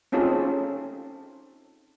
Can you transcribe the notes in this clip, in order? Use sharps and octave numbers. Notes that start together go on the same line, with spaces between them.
C4 C#4 D#4 F4 G#4 A4